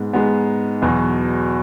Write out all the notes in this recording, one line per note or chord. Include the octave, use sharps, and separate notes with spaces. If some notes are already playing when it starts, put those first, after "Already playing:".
Already playing: G#2 G#3 B3
G#2 G#3 B3
E2 B2 F#3 B3